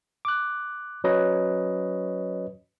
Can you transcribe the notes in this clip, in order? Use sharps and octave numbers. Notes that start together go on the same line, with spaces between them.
D6 F#6
F#3 C#4 B4 C#5 D#5